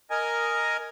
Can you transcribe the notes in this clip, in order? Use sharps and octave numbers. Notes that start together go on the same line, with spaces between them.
A#4 D#5 G#5